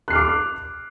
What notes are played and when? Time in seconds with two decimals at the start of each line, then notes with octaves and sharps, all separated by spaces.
0.08 F#6
0.10 C7
0.13 F6
0.15 D6